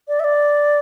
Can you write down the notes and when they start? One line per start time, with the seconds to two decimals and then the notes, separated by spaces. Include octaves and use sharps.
0.08 D5
0.20 E5
0.24 D5